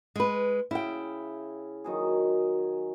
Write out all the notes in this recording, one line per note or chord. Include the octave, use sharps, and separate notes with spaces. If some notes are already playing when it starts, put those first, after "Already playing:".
G#3 B4
C#3 E4 G5
D#3 F#3 G#4